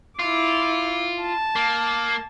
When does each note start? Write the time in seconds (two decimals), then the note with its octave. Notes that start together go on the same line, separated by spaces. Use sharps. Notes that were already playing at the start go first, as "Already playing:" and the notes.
0.19 E4 F4 D6
1.22 A5
1.56 A#3